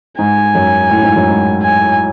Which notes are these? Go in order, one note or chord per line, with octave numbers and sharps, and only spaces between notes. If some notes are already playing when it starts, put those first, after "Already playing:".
G#2 G#5
F#2
A2
G#2
F#2
G#2
G#5